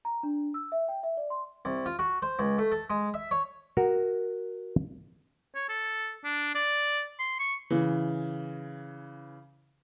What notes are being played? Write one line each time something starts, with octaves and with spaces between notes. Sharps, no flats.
A#5
D4
E6
E5
G5
E5
D5
C6
C2
F4
F#4
C5
C#2
A3
A4
G#3
E5
C#5
F#4 A#4
C#5
A4
D4
D5
C6
C#6
C#3 E3